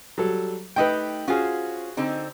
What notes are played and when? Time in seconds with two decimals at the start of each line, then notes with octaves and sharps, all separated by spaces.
0.18 F#3 G3 A4
0.76 A3 D#4 G4 B4 D#5 G5
1.28 C#4 F4 F#4 G#4 C5
1.97 D3 C4 D#4